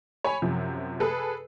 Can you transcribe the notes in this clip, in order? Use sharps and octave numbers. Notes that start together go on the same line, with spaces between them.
C#5 G#5 B5
F#2 C3 F3
G#4 A4 B4